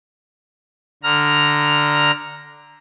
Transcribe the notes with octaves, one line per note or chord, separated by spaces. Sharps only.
D3 A#5 F6